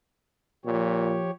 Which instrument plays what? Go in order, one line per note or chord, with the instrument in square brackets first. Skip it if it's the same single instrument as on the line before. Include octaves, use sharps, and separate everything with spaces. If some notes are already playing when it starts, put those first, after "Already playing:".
[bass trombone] A#2 [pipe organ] F3 G4 C#5